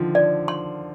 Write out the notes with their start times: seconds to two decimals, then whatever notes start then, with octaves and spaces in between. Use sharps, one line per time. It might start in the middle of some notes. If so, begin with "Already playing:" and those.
Already playing: D3 D#3 F3
0.15 D5
0.48 C6